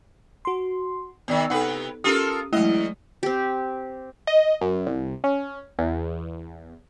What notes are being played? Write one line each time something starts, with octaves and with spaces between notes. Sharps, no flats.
F#4 C6
E2 C3 D#3 B3 D5
C3 D#4 A4 B4 F#5
C#4 F4 G4 A4 A#4 D#6
E2 F#3 G#3 A3 E4 D#5
C4 G4
D#5
F#2
C2
C#4
E2